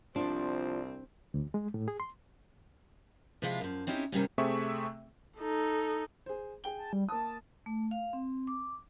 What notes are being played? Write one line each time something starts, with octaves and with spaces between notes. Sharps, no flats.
C2 F3 C4 D4
D2
G#3
A2
G#4
C6
C3 F3 G#3 E4 F4
F#2 F3
C4 C#4 D#4 E4 F#4 G4
C3 D#3 G3 C#4
C3 A3 C4 G#4 E5 C#6
D#4 A4
G#4 C5
G#4 G5 G7
A5
G3
A#3 A5 D#6
A3
F5
C4
D6